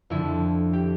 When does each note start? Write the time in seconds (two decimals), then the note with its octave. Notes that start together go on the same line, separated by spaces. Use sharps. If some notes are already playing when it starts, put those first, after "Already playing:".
0.10 F2 D3 E4
0.73 G4